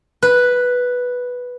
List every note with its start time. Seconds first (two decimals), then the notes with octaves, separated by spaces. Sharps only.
0.23 B4